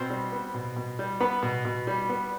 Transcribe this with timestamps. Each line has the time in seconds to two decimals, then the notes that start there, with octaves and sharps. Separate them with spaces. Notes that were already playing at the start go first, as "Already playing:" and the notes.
Already playing: B2 C4 C5
0.10 G3
0.32 B3
0.54 B2
0.77 B2
0.99 G3
1.20 B3 B4
1.43 B2
1.65 B2
1.87 G3
2.09 B3